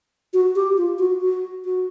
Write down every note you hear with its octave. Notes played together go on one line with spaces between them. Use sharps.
F#4
G4
F4
F#4
F#4
F#4